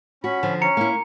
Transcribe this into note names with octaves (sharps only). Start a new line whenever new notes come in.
C#4 F#4 B5
D3 F3
C#4 A#5 C#7
A#3 E4